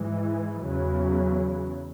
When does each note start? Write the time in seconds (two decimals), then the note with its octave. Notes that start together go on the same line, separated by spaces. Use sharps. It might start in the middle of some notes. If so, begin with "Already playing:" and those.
Already playing: G#2 E3 G#3
0.64 E2 C#3 F#3